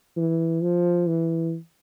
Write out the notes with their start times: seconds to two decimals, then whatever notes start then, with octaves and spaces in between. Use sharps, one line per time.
0.17 E3
0.62 F3
1.08 E3